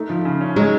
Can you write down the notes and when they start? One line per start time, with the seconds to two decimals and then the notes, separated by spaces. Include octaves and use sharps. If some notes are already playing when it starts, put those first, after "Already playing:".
Already playing: A3 D#4
0.10 F3
0.25 C#3
0.41 C#4
0.56 F#3 G#3 D#4